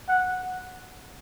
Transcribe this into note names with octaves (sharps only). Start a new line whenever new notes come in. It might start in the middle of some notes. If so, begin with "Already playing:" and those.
F#5